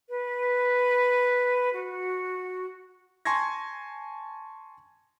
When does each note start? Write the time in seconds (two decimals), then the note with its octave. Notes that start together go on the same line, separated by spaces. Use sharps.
0.09 B4
1.73 F#4
3.25 G#5 A5 C6 C#6 G#6 A#6